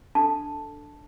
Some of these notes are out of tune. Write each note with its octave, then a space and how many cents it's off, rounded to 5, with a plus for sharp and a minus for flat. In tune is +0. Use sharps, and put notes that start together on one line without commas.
D4 +0 A4 +0 A5 +0